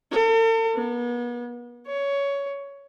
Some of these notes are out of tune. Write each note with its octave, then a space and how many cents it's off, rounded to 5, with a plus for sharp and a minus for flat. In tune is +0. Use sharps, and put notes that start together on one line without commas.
A4 +45
B3 -40
C#5 +15